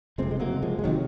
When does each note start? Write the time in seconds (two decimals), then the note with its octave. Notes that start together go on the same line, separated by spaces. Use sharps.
0.18 F#1 F2 C3 G#3 C4
0.31 G#3
0.40 F#3 A#3
0.62 F3 G#3
0.79 G#3
0.84 C3 D#3 F#3